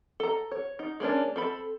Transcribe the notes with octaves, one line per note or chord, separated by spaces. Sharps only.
A4 A#5
C#5
D#4
G#3 A#3 C#4 D4
C4 A4 B5